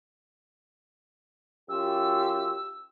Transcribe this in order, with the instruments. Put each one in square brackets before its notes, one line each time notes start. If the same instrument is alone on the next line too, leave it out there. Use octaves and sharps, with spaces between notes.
[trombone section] F#2 F4 G4 [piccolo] E6